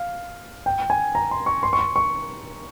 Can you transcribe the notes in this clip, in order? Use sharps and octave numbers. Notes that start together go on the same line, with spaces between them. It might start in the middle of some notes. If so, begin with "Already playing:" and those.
Already playing: F5
G5
G#5
A#5
C6
C#6
C6
C#6
C6
C#6